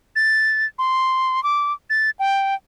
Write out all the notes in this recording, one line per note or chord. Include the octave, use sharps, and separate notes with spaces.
A6
C6
D6
A6
G5